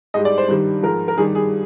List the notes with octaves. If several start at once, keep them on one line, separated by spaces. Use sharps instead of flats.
G#2 G3 D#5
D5
C5
G2 D#3 G3
G#2 F3 A#4
A#4
G2 D#3 G3 G#4
G#4